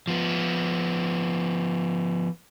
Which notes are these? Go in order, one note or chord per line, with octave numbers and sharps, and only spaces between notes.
F3 B3